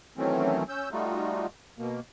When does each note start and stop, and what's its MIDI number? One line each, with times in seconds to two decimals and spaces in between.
0.17 0.63 51
0.17 0.63 52
0.17 0.63 54
0.17 0.63 57
0.17 0.63 60
0.17 0.63 61
0.69 0.89 61
0.69 0.89 88
0.69 0.89 91
0.92 1.46 55
0.92 1.46 57
0.92 1.46 63
0.92 1.46 65
0.92 1.46 66
1.79 2.00 47
1.79 2.00 58